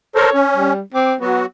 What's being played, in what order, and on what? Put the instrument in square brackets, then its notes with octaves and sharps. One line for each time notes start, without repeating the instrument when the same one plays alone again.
[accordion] A4 A#4 C5 [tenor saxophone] C#5
[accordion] C#4
[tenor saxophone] G3
[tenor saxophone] C4 [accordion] D6
[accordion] F#3 F#4 [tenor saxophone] B3